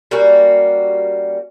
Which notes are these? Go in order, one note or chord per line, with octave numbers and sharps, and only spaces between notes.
G3 A#3 C#4 F#4